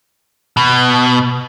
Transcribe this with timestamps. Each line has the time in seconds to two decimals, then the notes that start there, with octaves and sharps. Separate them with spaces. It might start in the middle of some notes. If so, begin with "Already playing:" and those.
0.57 B2